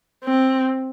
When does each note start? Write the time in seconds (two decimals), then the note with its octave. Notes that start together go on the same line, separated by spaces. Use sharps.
0.24 C4